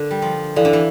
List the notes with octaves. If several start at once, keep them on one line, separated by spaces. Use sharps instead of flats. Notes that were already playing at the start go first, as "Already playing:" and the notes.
Already playing: D3 D4 A#4
G3
F3
E3 E4 A4 D5 F5
D3
E3